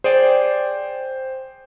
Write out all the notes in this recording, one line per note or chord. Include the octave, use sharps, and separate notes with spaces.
G#4 C5 D5 G5